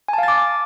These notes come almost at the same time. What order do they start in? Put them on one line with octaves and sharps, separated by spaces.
G#5 A5 F5 A6 D6